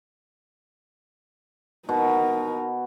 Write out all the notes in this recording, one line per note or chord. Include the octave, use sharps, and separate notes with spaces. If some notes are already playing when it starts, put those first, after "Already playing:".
B2 D#4 A#4